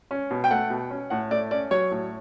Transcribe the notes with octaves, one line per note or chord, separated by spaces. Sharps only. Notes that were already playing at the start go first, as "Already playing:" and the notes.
C#4
B2
G5
A3 F#5
B2
C#4
A2 F#5
A3 D5
C#4 D5
F#3 C#5
A2